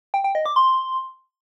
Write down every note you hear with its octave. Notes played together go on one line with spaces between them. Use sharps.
G5
G5
D#5
D6
C6